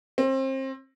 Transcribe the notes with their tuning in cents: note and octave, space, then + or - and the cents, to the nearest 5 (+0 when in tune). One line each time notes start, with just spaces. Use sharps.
C4 +30